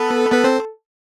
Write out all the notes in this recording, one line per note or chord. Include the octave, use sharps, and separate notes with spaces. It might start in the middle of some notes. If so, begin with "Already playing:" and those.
Already playing: B3 A4 B4
B3 B4
C4 C5